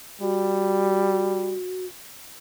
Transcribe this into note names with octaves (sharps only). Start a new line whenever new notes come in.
G3 F#4